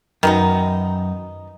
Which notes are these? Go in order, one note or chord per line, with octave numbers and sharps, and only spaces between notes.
F#2 D#3 B3 D#4